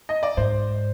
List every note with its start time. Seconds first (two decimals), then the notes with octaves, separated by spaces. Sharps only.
0.09 D#5
0.23 D5
0.37 G#2 C5